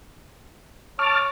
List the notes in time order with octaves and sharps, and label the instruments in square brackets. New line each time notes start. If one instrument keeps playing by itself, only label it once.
[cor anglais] C#5 [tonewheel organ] A5 D6 F6